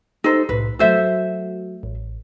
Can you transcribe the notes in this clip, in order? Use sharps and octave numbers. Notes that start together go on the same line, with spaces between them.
D#4 G4 A4 C5
C2 A2 B4
F#3 A3 F#4 A4 C5 E5
A1